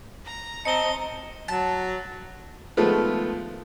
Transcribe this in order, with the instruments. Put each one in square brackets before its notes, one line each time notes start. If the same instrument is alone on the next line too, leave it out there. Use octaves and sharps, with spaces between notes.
[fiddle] A#5
[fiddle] C4 A5 [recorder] D#5 [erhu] A#5 [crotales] C#7 G7
[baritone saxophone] F#3 [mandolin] A5
[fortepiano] D#3 F3 G#3 A3 B3 F4